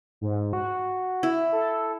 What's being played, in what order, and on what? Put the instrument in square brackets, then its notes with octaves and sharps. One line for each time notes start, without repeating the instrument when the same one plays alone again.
[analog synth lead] G#2
F#4
[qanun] E4
[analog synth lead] A4